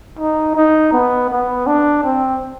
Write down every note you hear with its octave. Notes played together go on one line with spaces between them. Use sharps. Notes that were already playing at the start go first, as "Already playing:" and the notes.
D#4
D#4
B3
B3
D4
C4